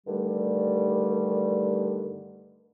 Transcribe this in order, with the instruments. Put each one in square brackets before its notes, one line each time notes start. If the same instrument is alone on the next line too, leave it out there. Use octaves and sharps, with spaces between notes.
[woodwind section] G2 D3 D#3 G3 A3 G4